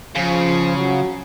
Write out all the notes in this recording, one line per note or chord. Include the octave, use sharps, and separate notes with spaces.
C#3 F3
F#3